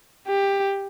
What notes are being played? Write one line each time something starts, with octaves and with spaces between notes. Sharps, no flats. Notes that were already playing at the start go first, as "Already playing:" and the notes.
G4